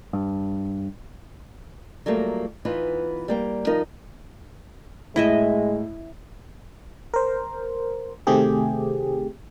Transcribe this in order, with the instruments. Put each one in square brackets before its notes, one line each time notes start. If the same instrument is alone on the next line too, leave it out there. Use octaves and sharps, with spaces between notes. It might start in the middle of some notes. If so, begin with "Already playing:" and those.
[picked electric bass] G2
[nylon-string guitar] F#3 G3 A3 A#3 F4
E3 B3 D#4 F4 B4
G3 A#3 G5
F3 D#4 A#4
[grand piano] A2 [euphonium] G#3 [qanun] E4 D#5 E5
[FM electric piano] A#4 C5
C3 D#3 A3 C4 G4 G#4